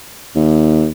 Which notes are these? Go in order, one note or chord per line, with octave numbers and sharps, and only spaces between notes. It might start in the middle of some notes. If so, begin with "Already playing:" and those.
D#2